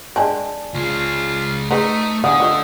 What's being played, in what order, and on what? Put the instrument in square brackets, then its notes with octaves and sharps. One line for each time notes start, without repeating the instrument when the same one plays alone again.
[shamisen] G#3 D4 G4 [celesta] D5 G#5 A5
[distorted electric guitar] C#2 G#4 [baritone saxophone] F4
[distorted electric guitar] A3 [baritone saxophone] D#4 [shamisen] G#4 B4 A#5
[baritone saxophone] E2 [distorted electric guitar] D3 [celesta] D5 F#5 D#6 [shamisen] F5
[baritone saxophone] A3 [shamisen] F4 A4 D#5